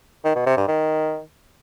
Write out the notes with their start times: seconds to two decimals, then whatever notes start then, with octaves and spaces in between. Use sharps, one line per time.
0.24 D#3
0.35 B2
0.46 C3
0.57 G2
0.68 D#3